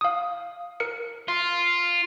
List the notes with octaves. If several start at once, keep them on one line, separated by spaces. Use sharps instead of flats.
F5 D#6
A#4 C#7
F4